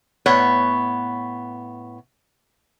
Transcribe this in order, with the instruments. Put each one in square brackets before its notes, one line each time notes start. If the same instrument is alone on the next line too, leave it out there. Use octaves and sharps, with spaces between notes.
[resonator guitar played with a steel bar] A2 B3 C#5